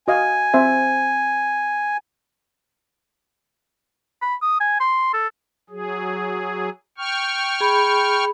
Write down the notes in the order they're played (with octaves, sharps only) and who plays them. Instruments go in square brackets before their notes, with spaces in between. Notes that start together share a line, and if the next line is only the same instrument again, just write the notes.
[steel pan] F#4 D#5 F5 [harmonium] G#5
[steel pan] C4 C5 E5
[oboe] B5
D#6
G#5
C6
A4
[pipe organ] F#3 G#4
G5 C#6 F6
[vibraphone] G#4 B5